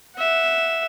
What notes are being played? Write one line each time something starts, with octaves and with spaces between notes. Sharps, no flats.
E5 F#5